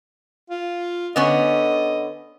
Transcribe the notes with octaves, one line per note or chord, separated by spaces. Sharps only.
F4
D3 B3 C#4 D#5